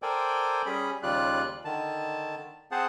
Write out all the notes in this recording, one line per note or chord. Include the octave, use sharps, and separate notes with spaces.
A4 A#4 C5 D5 G5 G#5
G3 C#4 G#4 B5
D#2 C#3 G3 F4 D5 F#6
D3 D#3 A5
C4 G#4 C5 F#5 A5